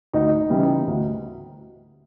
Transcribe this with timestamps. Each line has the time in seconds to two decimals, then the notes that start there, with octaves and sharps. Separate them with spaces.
0.13 D2 D#4
0.50 C#3 E3 G3 B3
0.87 D2